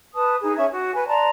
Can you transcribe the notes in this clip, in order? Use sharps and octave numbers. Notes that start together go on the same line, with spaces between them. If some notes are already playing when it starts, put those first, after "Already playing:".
B4 A5 D#6
D#4 G#4
C#4 E5 G#6
F#4
B4 G#5
D5 A5 A#5 C6